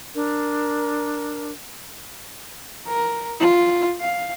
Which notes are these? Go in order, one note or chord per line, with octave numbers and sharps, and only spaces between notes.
D4 A#4
A#4
F4
F5